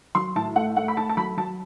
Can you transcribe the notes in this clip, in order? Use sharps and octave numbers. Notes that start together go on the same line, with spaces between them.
F#3 C6
A2 A5
A3 F#5
A3 F#5
B5
A3 A5
A5
F#3 B5
F#3 A5